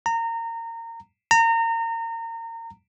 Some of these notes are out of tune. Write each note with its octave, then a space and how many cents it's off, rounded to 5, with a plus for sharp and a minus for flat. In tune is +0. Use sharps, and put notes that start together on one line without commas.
A#5 -25
A#5 -30